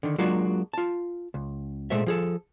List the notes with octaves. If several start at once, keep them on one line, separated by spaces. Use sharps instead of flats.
D3 D#3
F#3 G#3 A#3 D4 F4 F#4
F4 A5
C#2
A#2 G#3 A3 C5 E5
F3 G#4 A4